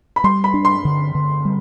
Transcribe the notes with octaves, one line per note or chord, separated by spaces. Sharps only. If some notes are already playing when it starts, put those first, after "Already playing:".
B5
G3 C6
B5
D4
C6
D3
D3
G3